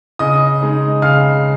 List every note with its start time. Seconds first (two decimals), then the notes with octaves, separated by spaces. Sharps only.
0.19 C#3 D#5 D#6
0.61 G#3 D#4
1.02 C#3 F5 F6